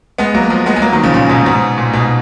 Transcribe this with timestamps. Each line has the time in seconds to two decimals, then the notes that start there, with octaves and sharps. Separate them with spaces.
0.18 G#3 B3
0.34 F#3 A#3
0.50 F3 G#3
0.66 G#3 B3
0.76 G#3
0.82 F#3 A#3
0.93 D#3 F#3
1.03 C#3 F3
1.14 A#2 C#3
1.29 G#2 B2
1.46 G#2 B2
1.78 A#2
1.93 G#2 B2